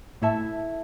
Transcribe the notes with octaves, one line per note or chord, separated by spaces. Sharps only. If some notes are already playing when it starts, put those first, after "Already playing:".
A2 E4 A4 E5 A5